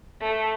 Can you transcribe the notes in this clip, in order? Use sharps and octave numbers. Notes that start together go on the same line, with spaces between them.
A3